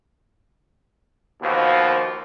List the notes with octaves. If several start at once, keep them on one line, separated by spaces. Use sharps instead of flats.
D#2 B2 F3